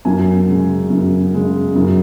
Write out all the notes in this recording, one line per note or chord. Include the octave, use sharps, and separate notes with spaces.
F#2 G#5
C#3 G#3
F#2
C#3 G#3
F#2